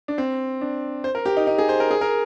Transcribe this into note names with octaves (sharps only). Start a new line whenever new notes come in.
D4
C4
D4
C5
A#4
G4
D#4
D#4
G#4
C5
A#4
G#4
A#4